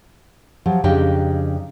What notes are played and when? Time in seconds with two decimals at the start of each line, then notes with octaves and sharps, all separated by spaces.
0.66 F3 F#3 G4
0.84 F2 C#3 D4 D#4 G4 G5